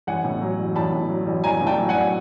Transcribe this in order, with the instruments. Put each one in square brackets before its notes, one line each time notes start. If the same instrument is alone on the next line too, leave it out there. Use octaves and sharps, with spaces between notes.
[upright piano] A1 F#5 G#5
A2
F#3
A1
A1 A5 B5
A2
F#3
A1
A1 G#5 A#5
A2
G5 A5
F#3
F#5 G#5